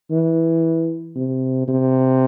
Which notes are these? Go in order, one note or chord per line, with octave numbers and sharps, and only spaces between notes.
E3
C3
C3